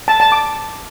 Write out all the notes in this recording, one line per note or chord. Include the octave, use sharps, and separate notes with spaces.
A5
A5
D6